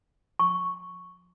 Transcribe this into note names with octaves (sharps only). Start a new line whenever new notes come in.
C#6